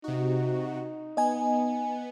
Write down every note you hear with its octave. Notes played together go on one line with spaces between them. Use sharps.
C3 D#4 F#4
B3 D#5 G#5